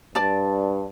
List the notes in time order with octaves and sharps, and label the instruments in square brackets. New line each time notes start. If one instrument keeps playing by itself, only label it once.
[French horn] G2 [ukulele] D5 A5